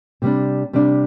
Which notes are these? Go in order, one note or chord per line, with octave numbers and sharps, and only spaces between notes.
C3 G3 D4
C3 G3 D4